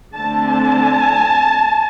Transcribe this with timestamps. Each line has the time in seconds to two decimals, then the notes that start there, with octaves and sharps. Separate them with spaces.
0.14 D3 A3 C4 A5
0.49 A5